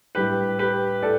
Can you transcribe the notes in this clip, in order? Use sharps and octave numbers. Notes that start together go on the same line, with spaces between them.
A2 G3 D4 G4 B4
G4 B4
A2 A4 D5